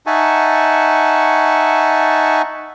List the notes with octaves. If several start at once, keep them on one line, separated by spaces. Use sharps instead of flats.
D#4 E5 F#5 G#5 A5 C#6